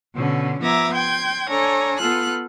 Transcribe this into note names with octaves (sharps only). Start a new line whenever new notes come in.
B2 D3 C#4
F3 B3 E5 A#5 D6 G#6
G5 C6 G6 G#6
D4 A4 C#5 G#5 A#5
B3 F4 A4 F6 F#6